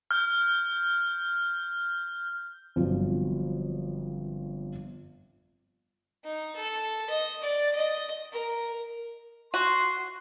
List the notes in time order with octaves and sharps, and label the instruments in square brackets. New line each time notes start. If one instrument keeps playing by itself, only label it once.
[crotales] F6 G6
[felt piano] G1 C3 F3 F#3
[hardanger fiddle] D#4
A4
D#5
D5
D#5
A#4
[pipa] F#4 [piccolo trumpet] C6